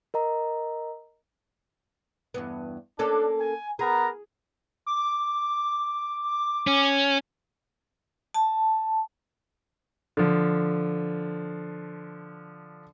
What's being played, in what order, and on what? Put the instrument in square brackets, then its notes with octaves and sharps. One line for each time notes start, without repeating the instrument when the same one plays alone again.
[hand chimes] A#4 D#5 A#5
[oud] E2 G2 B3
[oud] A#3 C#4 A4 [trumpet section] D4
[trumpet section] G#5
[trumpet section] B3 A#4 A#5 [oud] G#4
[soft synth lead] D6
[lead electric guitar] C#4
[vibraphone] A5
[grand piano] D3 F3